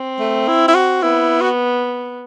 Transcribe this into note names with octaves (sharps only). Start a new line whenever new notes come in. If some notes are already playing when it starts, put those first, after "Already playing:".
Already playing: C4
A3
E4
E4
F#4
B3 E4
F#4